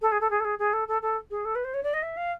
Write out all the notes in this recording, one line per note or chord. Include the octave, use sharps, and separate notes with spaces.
A4
G#4
A4
G#4
A4
G#4
G#4
A4
A4
A4
G#4
A4
B4
C5
C#5
D5
D#5
E5
F5